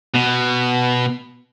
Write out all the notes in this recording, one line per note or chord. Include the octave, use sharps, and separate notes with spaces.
B2